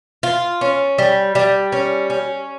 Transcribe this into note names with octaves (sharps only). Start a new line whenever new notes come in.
F4
C#4
G3
G3
C#4
C#4